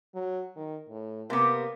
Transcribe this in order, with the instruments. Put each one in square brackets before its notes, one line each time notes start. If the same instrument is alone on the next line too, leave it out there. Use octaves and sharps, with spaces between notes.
[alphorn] F#3
D#3
A2
[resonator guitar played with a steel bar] C3 B3 [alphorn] A#3